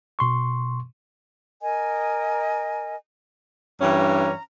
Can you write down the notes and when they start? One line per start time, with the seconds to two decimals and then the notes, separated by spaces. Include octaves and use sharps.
0.19 B2 C6 C#6
1.61 A#4 D#5 G#5
3.81 G2 E3 C#4 A#5